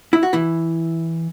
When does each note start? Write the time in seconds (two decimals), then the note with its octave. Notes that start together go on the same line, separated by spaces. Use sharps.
0.13 E4
0.23 F#4
0.33 E3 E4